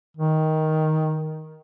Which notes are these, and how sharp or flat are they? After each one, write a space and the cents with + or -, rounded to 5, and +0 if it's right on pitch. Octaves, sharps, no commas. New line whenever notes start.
D#3 +10